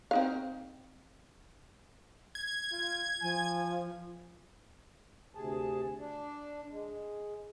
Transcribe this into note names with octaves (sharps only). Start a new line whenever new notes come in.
C4 D#4 F5
G#6
F4
F3 G#5
D2 C3 G#4 A5
D4
G#3